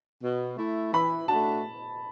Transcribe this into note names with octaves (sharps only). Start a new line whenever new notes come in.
B2
A3 E4
E3 B5
A3 D4 F#4 A5